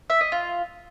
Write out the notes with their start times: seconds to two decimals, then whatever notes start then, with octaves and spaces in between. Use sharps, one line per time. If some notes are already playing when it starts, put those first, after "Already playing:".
0.10 E5
0.21 D#5
0.32 F4